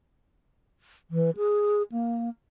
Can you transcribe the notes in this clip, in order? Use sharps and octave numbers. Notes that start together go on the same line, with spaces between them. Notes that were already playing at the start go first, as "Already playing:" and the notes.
E3
G#4
A#3